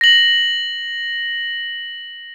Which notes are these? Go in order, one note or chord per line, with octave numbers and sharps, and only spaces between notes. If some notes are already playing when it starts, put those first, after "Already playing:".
A#6 F#7